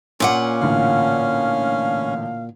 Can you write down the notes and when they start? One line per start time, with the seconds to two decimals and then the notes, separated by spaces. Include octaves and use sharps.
0.20 A#2 C#4 F4 F#5 C6 D6
0.61 A1 D3 F5